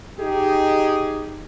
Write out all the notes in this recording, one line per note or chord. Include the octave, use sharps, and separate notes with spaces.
D#4 G4 G#4